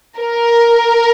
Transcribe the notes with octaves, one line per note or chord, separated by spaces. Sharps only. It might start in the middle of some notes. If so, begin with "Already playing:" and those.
A#4